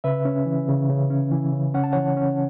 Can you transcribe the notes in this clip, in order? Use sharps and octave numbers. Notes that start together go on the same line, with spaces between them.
C#3 B4 E5
C#4
E3
C#3
C#3
C#4
E3
C#3
C#4 F#5
A5
E3 C#5 F#5
C#4